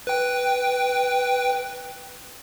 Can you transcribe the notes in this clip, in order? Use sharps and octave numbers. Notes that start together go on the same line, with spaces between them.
B4 G5